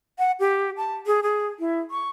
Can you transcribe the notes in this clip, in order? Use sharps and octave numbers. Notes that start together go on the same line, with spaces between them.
F#5
G4
A5
G#4
G#4
E4
C#6